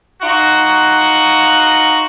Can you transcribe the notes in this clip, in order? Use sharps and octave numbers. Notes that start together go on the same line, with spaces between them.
D#4 F4 F#4